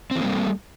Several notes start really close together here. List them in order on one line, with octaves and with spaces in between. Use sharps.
C4 E3 A#3 G3 A3